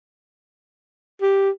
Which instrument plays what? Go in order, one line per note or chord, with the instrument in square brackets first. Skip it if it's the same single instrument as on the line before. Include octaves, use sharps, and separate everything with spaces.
[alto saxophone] G4